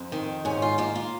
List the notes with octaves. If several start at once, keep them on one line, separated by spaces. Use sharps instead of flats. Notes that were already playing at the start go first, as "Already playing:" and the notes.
Already playing: F2 C4
D#3
G#2 C#4
F4
A#3 F4
F4